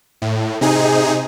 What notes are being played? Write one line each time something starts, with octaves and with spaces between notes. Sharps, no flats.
A2
C3 D#4 G#4